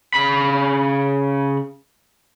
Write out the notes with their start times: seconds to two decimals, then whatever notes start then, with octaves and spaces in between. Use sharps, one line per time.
0.14 C#3 B5